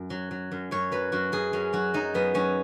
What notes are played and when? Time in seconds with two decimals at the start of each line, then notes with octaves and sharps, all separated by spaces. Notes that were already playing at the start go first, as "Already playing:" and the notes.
Already playing: F#2
0.10 F#3
0.31 F#3
0.52 F#2
0.71 F#2 C#5
0.92 F#3 B4
1.12 F#2 F#4
1.32 F#2 G#4
1.53 F#2 C#4
1.73 F#3 F#4
1.94 F#3 D#4
2.14 F#2 B3
2.34 F#3 C#4